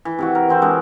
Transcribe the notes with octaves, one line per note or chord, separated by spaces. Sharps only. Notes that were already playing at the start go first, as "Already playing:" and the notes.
E3
C3 E3 F#4
A#4
E3 C4 C5
G#3 D4 B4